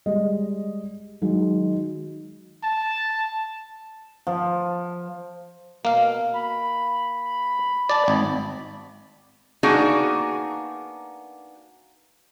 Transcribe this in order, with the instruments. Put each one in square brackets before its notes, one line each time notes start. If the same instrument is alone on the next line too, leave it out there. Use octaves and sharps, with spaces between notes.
[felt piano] G3 G#3 D#5
D#3 F#3 G#3
[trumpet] A5
[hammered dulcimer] F3
[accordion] B2 [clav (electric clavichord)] A#3 F5
[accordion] B5
[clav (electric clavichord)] D5 A5
G#1
[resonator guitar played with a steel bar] A#3 B3 D4 D#4 F#4 G#4